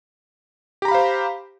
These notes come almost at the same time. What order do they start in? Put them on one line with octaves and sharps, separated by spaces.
G4 A#5 B5 F5 C5